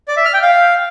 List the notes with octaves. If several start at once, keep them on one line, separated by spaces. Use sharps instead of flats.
D5
E5
F6
G5
F5